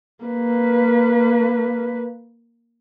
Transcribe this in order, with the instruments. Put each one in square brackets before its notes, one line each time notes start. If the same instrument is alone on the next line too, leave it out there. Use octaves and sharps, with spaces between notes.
[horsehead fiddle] A#3 B4